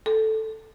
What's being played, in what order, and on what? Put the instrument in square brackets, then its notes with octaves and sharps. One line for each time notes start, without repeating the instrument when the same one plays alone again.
[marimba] A4